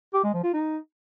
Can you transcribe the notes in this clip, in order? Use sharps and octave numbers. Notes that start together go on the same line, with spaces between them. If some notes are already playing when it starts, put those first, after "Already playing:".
G4
G#3
F3
F4
D#4